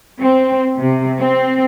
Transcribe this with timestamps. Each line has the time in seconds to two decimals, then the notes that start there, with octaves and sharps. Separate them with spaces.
0.22 C4
0.78 C3
1.19 C4